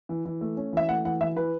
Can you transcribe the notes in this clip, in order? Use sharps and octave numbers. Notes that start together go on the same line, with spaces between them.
E3
E3
A3
C#4
E3 E5
A3 F#5
E3 F#5
E3 E5
E3 B4